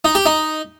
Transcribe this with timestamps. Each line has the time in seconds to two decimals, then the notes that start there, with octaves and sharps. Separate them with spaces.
0.04 D#4
0.15 G4
0.26 D#4